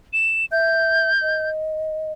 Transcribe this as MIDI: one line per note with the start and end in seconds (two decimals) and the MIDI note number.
0.13 0.46 100
0.52 1.10 76
0.52 1.50 91
1.22 2.12 75